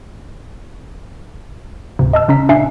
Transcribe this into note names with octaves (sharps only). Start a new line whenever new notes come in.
D2 G#2 C3
D#5 A5 E6
C#3 C#4 A#5 B6
A#2 D4 E5 G#5 C7